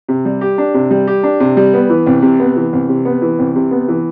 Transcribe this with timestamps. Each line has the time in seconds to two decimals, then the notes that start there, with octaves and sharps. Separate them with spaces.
0.09 C3
0.25 G3
0.41 G4
0.58 D4
0.74 C3
0.91 G3
1.07 G4
1.23 D4
1.40 C3
1.57 G3
1.74 B3
1.89 E3
2.07 C2
2.22 C3
2.40 B3
2.56 E3
2.73 C2
2.89 C3
3.05 B3
3.22 E3
3.39 C2
3.56 C3
3.71 B3
3.88 E3